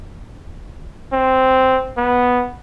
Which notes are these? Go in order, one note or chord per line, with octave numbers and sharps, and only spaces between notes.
C4
B3